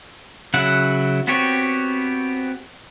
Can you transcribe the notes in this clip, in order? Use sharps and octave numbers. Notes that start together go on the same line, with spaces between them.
C#3 F#3 E4 F#5
B3 C4 F#4 G4 C#5